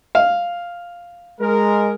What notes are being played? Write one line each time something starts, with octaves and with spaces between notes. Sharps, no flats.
F5
G#3 A#4